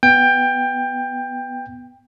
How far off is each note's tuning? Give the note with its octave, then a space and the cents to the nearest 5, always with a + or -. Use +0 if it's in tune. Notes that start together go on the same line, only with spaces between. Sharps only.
B3 +0 G5 +15